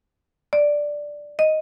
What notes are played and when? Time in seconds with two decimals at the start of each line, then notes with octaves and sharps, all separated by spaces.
0.53 D5
1.39 D#5